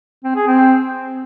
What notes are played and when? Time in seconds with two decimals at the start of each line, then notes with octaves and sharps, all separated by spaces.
0.25 C4
0.36 G#4
0.47 C4